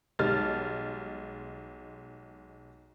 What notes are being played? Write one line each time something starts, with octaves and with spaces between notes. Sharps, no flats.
B1 G3 G#3 F6 A6